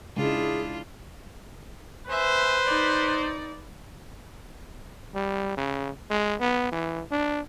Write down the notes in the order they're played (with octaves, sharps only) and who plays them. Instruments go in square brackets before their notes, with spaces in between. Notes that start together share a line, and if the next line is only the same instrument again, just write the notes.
[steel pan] C#3 G#3 [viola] D4 E4 [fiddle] F4 [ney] G#4
[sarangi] B4 [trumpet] C5 [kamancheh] E5 G#5
[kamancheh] D#4 D5
[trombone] G3
C#3
G#3
B3
E3
D4